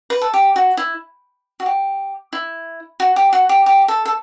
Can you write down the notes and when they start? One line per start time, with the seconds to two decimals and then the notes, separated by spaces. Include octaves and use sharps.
0.10 B4
0.22 A4
0.34 G4
0.56 F#4
0.77 E4
1.60 F#4
1.66 G4
2.33 E4
3.00 F#4
3.16 G4
3.33 F#4
3.49 G4
3.66 G4
3.88 A4
4.05 A4